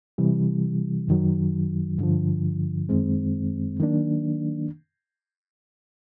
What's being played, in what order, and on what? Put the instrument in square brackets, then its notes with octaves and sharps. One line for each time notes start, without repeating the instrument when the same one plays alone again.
[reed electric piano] C3 E3 G3
F#2 D#3 F#3
G2 D3 F3
F#2 D#3 G#3 C4
D#3 F#3 A#3 D4